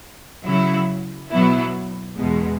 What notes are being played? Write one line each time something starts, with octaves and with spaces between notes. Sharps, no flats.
C#3 F#3 E4
B2 F#3 B3 E4
E2 B2 G#3